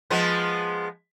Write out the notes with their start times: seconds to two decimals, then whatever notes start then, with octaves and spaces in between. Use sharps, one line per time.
0.10 F3 G#3 B3